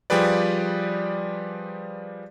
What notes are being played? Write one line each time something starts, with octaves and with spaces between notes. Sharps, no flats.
F3 G3 G4 G#4 B4 D5